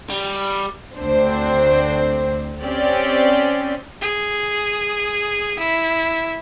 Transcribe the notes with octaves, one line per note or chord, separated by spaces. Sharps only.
G3
D2 C4 D4 C5
C4 C#4 G4 D5
G#4
E4